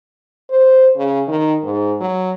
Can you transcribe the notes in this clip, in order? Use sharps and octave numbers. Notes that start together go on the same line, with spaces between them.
C5
C#3
D#3
G#2
F#3